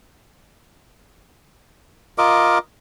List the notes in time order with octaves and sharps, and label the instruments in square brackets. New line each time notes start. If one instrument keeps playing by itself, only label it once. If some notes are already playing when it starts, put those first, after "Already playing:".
[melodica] F4 A#4 D#5 D6